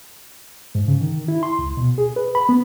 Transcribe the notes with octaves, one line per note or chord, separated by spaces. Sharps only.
G#2
C#3
D#3
E4
C6
C#2
B2
G#4
B4
B5
B3